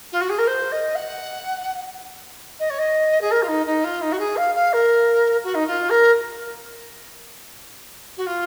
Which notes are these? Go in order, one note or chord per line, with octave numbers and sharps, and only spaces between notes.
F4
F#4
G#4
A#4
C5
D#5
F#5
D#5
C#5
D#5
G#4
A#4
F4
D#4
D#4
F4
D#4
F#4
G#4
F5
F5
A#4
F#4
D#4
F4
A#4
F#4
F4